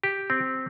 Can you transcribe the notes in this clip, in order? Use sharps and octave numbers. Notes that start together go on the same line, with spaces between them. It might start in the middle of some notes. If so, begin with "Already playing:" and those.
G4
C4